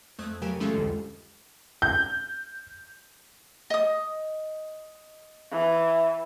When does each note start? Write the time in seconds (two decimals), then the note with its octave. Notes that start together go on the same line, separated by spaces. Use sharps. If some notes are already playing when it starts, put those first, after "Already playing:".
0.19 F2 A3 D#6 F#6 G#6
0.42 C#3 F#3 G4 A#4 G#5 E7
0.60 E3 G#3 A3 C#4 F4 A4
0.74 C2 F2 G#2 D3
1.82 G6
3.70 D#5 D#6
5.51 E3